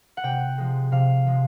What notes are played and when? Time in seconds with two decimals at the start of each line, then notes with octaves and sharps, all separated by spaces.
0.17 F#5
0.23 C3 G5
0.58 F3 G#3
0.92 C3 F5
1.26 F3 G#3